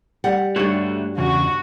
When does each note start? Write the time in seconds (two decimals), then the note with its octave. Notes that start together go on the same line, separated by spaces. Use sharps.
0.24 G3 F#5
0.56 G2 A3 D4 F#4 C#5
1.18 E2 C#3 F#4